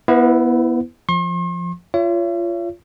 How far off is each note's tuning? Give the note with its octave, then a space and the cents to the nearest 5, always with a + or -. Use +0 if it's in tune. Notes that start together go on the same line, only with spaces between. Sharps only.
B3 -20 E4 +0 B4 +40
F3 +0 C6 +45
F4 -15 C#5 +25 E5 +40